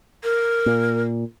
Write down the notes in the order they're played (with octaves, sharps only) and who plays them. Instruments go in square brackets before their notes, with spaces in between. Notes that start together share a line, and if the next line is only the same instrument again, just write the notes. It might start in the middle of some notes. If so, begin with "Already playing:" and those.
[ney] A#4
[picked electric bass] A#2